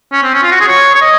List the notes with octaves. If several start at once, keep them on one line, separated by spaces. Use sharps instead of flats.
C#4
C4
C#4
F4
F#4
G#4
C#5
C#5
D#5